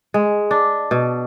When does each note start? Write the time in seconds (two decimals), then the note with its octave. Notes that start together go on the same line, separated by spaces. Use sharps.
0.14 G#3
0.51 D4
0.91 B2